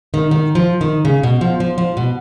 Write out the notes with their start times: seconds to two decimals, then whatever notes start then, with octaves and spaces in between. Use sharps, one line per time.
0.14 D#3
0.31 D#3
0.55 F3
0.81 D#3
1.05 C#3
1.23 B2
1.41 F3
1.60 F3
1.78 F3
1.97 B2